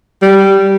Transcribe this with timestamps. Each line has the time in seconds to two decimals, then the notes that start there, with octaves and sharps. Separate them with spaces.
0.22 G3